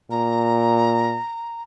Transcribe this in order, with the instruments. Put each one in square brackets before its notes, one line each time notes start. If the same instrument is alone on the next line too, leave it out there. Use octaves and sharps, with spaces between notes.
[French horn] A#2 [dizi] A#5